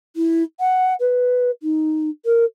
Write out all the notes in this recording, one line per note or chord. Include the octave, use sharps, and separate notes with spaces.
E4
F#5
B4
D#4
A#4